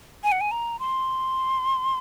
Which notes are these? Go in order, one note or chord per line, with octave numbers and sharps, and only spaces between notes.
G#5
F#5
G#5
A#5
C6